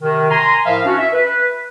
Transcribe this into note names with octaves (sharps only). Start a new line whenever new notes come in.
C3 D#3
G#5 A#5 C6
A2 F3 A#4 E5 F5
C#4 D4 F#4
E5
B4